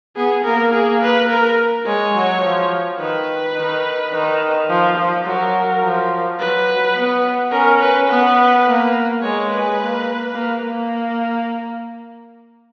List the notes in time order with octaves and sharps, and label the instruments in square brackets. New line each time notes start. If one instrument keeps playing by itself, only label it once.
[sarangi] B3 [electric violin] G#4
[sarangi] A#3 [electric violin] A#4
[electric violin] G#4
B4
A#4
[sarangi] G#3 [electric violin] C#5
[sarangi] F#3
F3
[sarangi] D#3 [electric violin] B4
[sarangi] D#3
D#3
F3
F3
[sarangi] F#3 [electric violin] A#4
[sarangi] F3
[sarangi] F#3 [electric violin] B4
[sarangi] B3
[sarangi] C#4 [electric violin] A#4
[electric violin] B4
[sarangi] B3 [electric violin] B4
[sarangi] A#3
[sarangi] G#3 [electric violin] C#5
[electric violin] B4
[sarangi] A#3
A#3
A#3